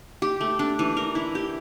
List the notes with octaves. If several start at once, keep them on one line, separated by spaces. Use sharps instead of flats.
G4
A3
D4
E3
A#4
E4
G4